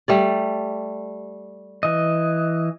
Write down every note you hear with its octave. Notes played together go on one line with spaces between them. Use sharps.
G3 A3 D5
E3 D#5